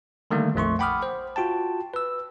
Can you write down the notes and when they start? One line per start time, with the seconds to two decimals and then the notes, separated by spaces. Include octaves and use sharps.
0.31 D3 D#3 G3 A3 A#3
0.55 A#1 F2 A3 C6 C#6
0.79 F#5 G5 B5 D6 D#6 F6
1.03 C5
1.36 F4 F#4 G5 A5
1.94 B4 E6